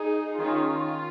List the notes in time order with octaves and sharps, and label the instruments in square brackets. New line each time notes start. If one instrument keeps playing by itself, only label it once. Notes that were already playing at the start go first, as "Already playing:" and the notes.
Already playing: [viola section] D#4 G#4
D#3 C#4 F4